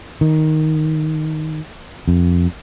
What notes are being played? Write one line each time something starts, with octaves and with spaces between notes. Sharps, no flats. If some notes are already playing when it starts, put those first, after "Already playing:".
D#3
F2